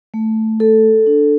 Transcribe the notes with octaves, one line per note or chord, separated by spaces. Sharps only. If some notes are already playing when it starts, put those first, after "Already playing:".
A3
A4
D4